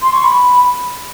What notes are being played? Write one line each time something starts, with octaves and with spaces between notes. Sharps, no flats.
C6
C#6
B5